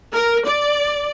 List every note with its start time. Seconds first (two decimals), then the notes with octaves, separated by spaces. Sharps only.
0.13 A#4
0.45 D5